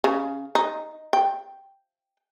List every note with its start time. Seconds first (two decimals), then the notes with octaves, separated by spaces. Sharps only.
0.04 C#3
0.55 D#4
1.13 G5